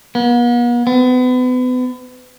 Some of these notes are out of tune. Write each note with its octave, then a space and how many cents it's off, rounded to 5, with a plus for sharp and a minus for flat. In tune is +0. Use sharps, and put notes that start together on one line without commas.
B3 -45
B3 +35